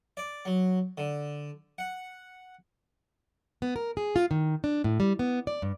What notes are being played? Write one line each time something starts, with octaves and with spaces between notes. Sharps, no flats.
D5
F#3
D3
F#5
B3
A#4
G#4
F4
D#3
D4
A2
G3
B3
D5
G2